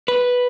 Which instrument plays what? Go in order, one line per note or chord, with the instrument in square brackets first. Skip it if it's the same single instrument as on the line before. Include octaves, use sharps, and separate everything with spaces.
[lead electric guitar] B4